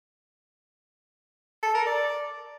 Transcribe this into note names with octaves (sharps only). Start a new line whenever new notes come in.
A4
A#4
D5